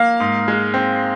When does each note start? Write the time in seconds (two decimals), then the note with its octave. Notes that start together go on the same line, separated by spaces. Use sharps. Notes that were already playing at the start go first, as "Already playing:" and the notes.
Already playing: A#3 F5
0.20 G#2
0.48 G#3
0.74 C4